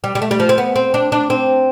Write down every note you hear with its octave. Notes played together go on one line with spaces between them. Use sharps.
G3
G3
A3
G3
F3
C4
B3
C4
D4
D4
C4